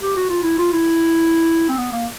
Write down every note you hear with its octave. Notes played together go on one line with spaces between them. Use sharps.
G4
F#4
F4
E4
F4
E4
C4
B3
A#3